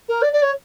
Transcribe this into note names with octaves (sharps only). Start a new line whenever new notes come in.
A#4
D5
D5
C#5